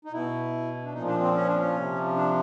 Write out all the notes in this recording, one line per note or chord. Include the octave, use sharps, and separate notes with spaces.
D#4
B2 E4
D4
A#2 F3 D#4
D4
C4
C#4
D4
C#4
C3 F3
D4